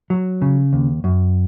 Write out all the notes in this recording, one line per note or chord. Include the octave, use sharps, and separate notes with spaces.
F#3
C#3
D#2
F#2